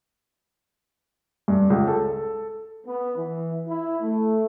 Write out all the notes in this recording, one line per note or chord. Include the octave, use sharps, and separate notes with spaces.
G2
C#2
A4
B3
E3
E4
A3